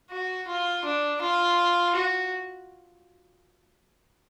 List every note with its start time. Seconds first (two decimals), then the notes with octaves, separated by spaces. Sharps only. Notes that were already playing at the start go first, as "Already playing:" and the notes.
0.11 F#4
0.48 F4
0.85 D4
1.21 F4
1.96 F#4